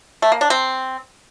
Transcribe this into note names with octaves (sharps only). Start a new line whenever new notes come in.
A3
A#3
D4
C4